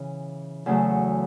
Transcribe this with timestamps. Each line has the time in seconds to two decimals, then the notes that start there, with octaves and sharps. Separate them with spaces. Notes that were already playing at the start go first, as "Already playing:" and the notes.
Already playing: C#3 E3
0.66 E2 C#3 F#3 A3